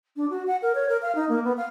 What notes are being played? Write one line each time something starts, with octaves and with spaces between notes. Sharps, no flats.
D4
F#4
F#5
A#4
C#5
A#4
F5
D#4
A#3
B3
F5